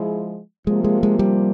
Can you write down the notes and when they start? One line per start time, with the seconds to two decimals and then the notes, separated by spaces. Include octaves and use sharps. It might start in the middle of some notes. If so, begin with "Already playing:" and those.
Already playing: F3 G#3 E4 G#4
0.67 C3 F3 G#3 A#3
0.84 G#3
1.03 G#3
1.19 G3